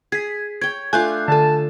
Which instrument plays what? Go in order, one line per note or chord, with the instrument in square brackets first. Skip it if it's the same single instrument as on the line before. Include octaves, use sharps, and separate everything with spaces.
[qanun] G#4 [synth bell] G#6 B6
[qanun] C#5 G5 [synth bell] G#6
[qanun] A3 D4 F4 [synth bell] G#5 F#6 G6
[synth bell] D3 A4 [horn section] A5